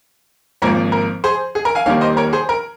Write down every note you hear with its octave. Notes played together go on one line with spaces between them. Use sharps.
G#1 G#2 F3 A#3 A#4 C#5
A#4
G#4 C5
G#4
A#4
F5 G#5
D#2 D#3 G3 A#3 C#5 F5
C5 D#5
A#4 C#5
G#4 C5
A#4